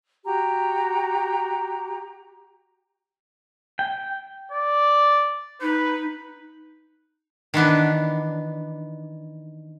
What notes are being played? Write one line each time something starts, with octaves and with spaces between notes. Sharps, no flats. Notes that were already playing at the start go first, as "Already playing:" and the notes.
F#4 G4 A#5
G5
D5
D#4 B4
D#3 E3 B3 D4